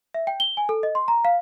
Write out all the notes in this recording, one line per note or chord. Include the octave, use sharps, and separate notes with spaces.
E5
G5
G7
G#5
A4
D#5
C6
A#5
F5